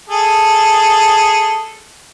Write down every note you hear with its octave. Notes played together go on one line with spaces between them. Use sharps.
G#4 A4